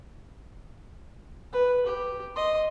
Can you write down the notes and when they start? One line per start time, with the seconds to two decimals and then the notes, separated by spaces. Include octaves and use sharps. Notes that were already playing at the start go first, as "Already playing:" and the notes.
1.52 B4
1.87 G4
2.36 D#5 C6